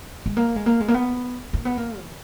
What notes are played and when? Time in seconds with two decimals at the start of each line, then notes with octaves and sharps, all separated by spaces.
0.26 G#3
0.37 A#3
0.56 G#3
0.66 A#3
0.80 G#3
0.88 A#3
0.94 B3
1.53 A#3
1.65 B3
1.77 A#3
2.00 E3